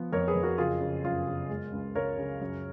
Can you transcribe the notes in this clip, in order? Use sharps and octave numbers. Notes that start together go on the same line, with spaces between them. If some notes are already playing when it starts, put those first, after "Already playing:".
Already playing: F3 B3
F2 A#4 C#5
G#4 B4
F2
F#4 A#4
F#1 F4 G#4
C#3
F#2 F4
C#3
G#3
C#2
C#2 A#4 C#5
C#3
F#2